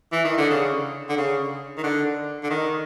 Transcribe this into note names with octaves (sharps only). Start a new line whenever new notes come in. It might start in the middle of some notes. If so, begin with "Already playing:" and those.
E3
D#3
D3
C#3
D3
C#3
D#3
D3
D3
D#3